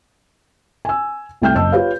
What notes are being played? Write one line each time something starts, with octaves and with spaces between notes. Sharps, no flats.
G#5 E6
C2 A3 G5 F6 G6
F#1 D#5 A5 E6
F4 G4 B4 C#5 F5